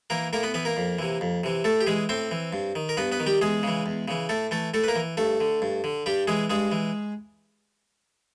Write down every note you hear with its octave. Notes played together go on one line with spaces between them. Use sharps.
E3 A#3 A#4
A2 A#3 A#4
B3 B4
E3 B3 B4
A#3 A#4
F2
C3 E3
F2
C3 E3
A2 A3 A4
G4
E3 G#3 G#4
A2 C4 C5
E3
G2
D#3
A#4
G2 B3 B4
B3 B4
D#3
G3 G4
E2 G#3 G#4
C#3 E3
E2
C#3 E3
A2 A3 A4
E3 A3 A4
A2 A3 A4
B4
A#3 A#4
E3
G2 A3 A4
D3
G2
D3
G2 G3 G4
E3 G#3 G#4
G2 G#3 G#4
E3